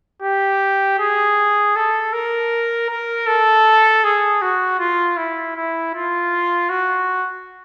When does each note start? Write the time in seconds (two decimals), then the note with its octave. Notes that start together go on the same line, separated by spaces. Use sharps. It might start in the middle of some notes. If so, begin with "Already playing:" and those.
0.23 G4
0.99 G#4
1.76 A4
2.13 A#4
2.89 A#4
3.27 A4
4.04 G#4
4.42 F#4
4.79 F4
5.17 E4
5.56 E4
5.94 F4
6.69 F#4